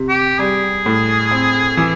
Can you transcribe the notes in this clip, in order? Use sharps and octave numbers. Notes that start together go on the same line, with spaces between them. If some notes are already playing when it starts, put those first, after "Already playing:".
Already playing: C3
G4
G3 G#4
A2
C4
E3